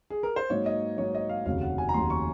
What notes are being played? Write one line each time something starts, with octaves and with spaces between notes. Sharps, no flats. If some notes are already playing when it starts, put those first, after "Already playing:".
G#4
A#4
C5
G#2 F#3 A#3 D#4 C#5
D#5
G#2 F#3 A#3 D#4 C#5
D#5
F5
F1 D#2 C#3 F#3 F5
F#5
G#5
A#5
F1 D#2 C#3 F#3 C6
C#6